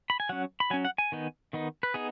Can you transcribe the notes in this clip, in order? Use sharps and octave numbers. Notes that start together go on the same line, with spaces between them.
B5
G#5
F#3 C#4 F#5
B5
F#3 C#4 G#5
F#5
G#5
D#3 B3 D#4
D#3 B3 D#4
B4
B3 D#4 G#4